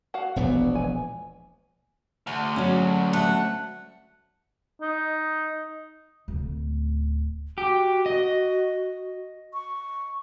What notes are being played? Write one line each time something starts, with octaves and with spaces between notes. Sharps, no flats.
F#4 F5
E1 A#1 B3
G#5
D2 G#4
F#3 C#4
A3 E5 F#5
D#4
D1 D2
F#4 G4
D#5
C#6